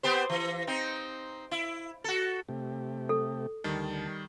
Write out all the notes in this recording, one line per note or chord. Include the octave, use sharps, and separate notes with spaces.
B3 G4 C5
E3
C4 D#4
E4
F#4 A4
C3 A3 G4
A4
D2 D#3 G3 A5